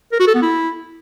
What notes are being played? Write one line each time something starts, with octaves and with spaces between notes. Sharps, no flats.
A#4
F#4
A4
B3
E4